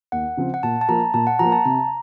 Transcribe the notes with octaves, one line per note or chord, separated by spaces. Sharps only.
D#2 F#5
C#3 F3 C4
F#5
A#2 A5
A5
F3 A#3 A#5
A#2 A5
F#5
F3 A#3 A#5
A5
C3 A#5